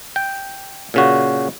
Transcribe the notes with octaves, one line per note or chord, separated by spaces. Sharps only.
G5
A#2 C#3 F#4